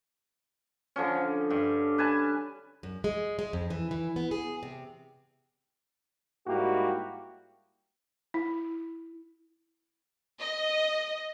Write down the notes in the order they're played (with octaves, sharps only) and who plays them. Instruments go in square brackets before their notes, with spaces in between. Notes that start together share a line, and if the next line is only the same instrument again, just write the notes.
[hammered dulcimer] D3 F3 C#4
G2
B4 G#5 A5
[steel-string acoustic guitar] F#2
G#3
G#3
F2
E3
E3
B3
G#4
C3
[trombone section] G#2 G3 A#3 E4 F#4 G4
[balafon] E4
[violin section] D#5